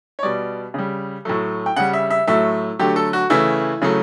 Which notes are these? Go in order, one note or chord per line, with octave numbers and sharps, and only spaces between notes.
C#5
B2 G3 D5
C#3 G3
A2 F#3 A3
G5
C#3 G3 F#5
E5
E5
A2 F#3 A3 E5
D3 F#3 A3 G4
A4
F#4
C#3 E3 A3 E4
C#3 F#3 A3